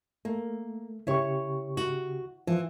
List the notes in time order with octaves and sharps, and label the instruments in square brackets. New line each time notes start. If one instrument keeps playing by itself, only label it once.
[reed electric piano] A3 [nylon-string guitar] A#3
[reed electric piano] C#3 G4 C#6 [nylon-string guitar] E4 C#5
[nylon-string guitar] F#4
[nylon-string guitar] E3 [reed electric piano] F3